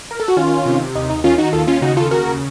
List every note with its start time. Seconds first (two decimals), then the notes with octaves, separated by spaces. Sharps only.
0.11 A#4
0.20 A4
0.28 F#4
0.37 D#3 C#4 F4
0.66 C3
0.95 D#2 D#4
1.10 D#4
1.24 D#3 C#4 F4
1.38 D#4 F#4
1.53 D#2 F4 A4
1.67 C#4 F4
1.82 C#3 D#4 F#4
1.97 F4 A4
2.11 D#2 F#4 A#4